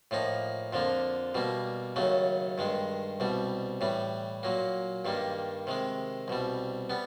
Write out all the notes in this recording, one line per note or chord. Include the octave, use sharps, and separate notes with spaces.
A2 F3 A#3 D#4
F2 D3 F3 A#3
B2 G3 A#3
D#2 C#3 F#3 A3
G2 D#3 G#3
C2 B2 G3
A2 E3 G3
A#2 F#3 A#3
G2 D#3 G3 A#3
C3 D#3 G#3
C2 B2 G3
G3 B3